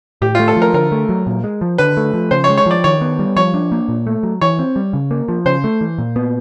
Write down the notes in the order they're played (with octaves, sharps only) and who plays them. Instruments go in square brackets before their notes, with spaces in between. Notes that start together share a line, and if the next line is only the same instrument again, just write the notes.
[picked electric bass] A2 [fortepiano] G4
[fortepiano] F4
[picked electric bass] A3
[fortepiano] A4
[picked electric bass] F3
[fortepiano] A#4
[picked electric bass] D3 [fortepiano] A#4
[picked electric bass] A3
F#3
A#2
G#3
F3
[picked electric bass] D3 [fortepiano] B4
[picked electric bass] A3
F3
[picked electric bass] C#3 [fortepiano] C5
[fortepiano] C#5
[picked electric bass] G#3
[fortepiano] C#5
[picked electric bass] F3 [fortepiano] D5
[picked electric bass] D#3 [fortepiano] C#5
[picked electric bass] B3
G3
[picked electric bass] F3 [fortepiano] C#5
[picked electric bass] D4
A#3
A#2
A3
F#3
[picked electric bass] E3 [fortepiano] C#5
[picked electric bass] C4
G3
C#3
A#3
F3
[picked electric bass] C#3 [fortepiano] C5
[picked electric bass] A3
E3
A#2
B3